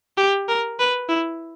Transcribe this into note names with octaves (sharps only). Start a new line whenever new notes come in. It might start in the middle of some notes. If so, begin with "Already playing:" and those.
G4
A#4
B4
E4